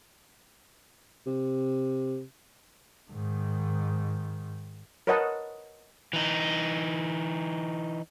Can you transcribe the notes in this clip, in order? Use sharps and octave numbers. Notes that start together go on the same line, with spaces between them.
C3
G#2 D#3
A#4 B4 C#5 D#5 F#5 A5
E3 D#4